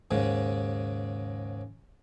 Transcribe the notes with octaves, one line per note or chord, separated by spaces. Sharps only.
D#2 G#2 C#3